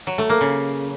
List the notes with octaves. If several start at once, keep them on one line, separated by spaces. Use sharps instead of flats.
F#3
A3
A#3
C#3